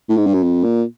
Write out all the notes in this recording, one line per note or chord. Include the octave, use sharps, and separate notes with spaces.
A2
G#2
G2
F#2
F2
A#2